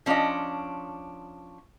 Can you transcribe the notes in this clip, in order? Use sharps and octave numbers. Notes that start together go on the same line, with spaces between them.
F3 C#4 D4 F4 D#5